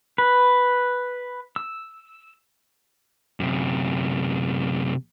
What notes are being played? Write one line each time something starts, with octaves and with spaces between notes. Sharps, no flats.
B4
E6
F#2 C3